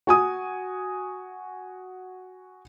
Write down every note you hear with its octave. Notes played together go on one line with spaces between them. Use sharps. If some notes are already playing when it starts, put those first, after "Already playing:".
F#4 G#5 D#6